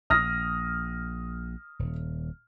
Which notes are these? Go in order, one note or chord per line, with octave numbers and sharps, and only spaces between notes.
A#1 D#6 F6 A#6
D#1